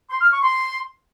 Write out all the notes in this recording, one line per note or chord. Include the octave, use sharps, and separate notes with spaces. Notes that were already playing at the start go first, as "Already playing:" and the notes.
C6
F6
C#6
C6